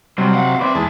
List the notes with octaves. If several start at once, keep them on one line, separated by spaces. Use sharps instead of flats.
C3 F#3 G3
F5 F#5
B1 C4 B4 D5 E5
E2 G#3 A5